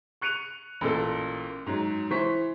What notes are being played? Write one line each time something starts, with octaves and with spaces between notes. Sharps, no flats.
C#6 F#6 C#7 D#7 F7
A1 A#2 A4
G#2 F#3
E3 C5 C#6 B6